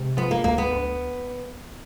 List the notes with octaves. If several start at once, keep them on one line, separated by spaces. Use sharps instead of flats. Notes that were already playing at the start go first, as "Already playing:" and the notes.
Already playing: C3 G#3
F3 B3
A#3
D2 A#3
B3
D2